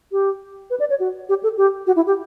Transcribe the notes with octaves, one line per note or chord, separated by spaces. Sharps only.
G4
B4
D5
C#5
F#4
G4
A4
G4
F#4
E4
G4